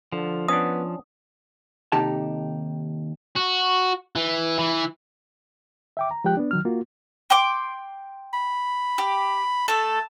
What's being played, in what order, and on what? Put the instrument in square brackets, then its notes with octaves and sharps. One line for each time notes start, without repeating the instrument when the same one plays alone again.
[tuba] D3 [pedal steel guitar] F3
[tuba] B3 [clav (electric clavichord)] C#4 D4 [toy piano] D#6
[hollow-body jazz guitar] D#2 C3 D#4 G4 A4 A5
[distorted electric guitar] F#4
E3
E3
[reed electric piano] E5 G5 D6
A#5
F3 G#3 G4 G5 F#6
B3 D4
D#3 F#3 F6
A#3 F4 F#4
[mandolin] G5 C6 D6
[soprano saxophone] B5
[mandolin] G4
[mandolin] A3 A4 [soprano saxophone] A5